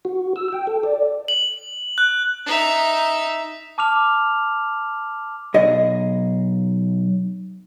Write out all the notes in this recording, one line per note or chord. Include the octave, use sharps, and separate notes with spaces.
F#4
E6
G5
A4
D5
F#7
F#6
D#4 E5
A5 D6 F6 F7
B1 G#4 D#5